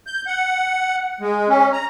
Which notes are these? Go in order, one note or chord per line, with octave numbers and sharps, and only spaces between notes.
G6
F#5
G#3
C#4
A#5